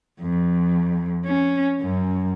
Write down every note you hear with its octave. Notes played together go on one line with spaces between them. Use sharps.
F2
C#4
F#2